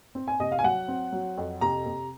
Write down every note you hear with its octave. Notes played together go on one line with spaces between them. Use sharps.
C4
G#5
C3 D#5
F5
G#5
F#3 F#5
C4
F#3
F2
C3 A#5
C3